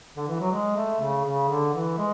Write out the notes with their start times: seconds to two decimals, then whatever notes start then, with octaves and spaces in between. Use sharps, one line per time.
0.16 D3
0.28 E3
0.40 F#3
0.51 G#3
0.76 A3
1.01 C#3
1.25 C#3
1.49 D3
1.73 E3
1.98 G#3